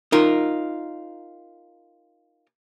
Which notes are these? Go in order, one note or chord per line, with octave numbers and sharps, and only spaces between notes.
D#4 F4 A#4